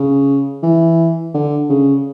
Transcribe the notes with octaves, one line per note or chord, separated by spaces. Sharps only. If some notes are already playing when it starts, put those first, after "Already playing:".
Already playing: C#3
E3
D3
C#3